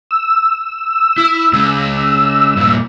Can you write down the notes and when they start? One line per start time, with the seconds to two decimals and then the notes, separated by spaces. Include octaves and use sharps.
0.11 E6
1.18 E4
1.53 C#3 G#3
2.57 G2 A#2